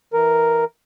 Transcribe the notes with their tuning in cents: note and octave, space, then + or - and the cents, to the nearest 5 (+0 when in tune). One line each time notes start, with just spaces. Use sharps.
E3 -15 A#4 +0